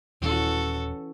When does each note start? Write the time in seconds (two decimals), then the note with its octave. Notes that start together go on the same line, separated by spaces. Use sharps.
0.22 D#1 E3 C#4 F#4 A4